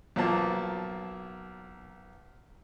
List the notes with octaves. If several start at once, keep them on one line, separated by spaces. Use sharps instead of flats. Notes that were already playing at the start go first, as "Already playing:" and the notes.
B1 F3 F#3 A#3 A5